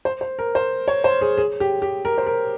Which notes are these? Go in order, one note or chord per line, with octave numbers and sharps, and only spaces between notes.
C5
C5
A#4
C5
C#5
C5
G#4
G#4
G4
G4
A#4
C5
A#4